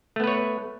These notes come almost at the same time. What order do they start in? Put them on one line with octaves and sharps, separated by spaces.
A3 B3 B4 C#5